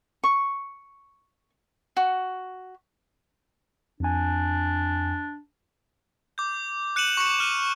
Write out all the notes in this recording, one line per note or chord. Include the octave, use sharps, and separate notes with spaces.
C#6
F#4
F2 D4 G#5
D6 G6
F#6 C#7 D#7 E7 F#7
C#6 C#7
F6 D#7